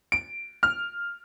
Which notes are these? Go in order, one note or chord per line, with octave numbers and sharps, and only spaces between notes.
D7
F6